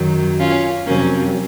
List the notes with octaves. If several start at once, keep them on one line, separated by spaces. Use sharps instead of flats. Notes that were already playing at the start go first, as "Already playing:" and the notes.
Already playing: F#2 D#3 F#3
C#4 F4
F2 C3 F#3 A#3 C#4